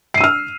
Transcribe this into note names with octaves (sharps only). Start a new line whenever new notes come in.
E6 F6 C7 D#7